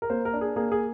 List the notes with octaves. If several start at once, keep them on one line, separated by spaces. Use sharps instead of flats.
A#4
A#3 C5
A#4
D4
G#4
A#3 G#4
G#4